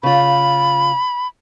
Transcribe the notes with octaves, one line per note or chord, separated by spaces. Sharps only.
C#3 F4 B5